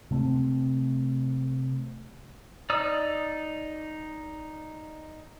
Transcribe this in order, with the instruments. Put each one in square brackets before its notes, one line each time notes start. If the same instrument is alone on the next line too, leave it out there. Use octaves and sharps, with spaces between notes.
[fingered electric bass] C3 A3 C4
[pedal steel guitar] D#4 D5 D#6 E6